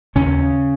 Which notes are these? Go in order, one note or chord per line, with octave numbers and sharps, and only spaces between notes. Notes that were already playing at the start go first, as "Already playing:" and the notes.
D#2 C#3 C#4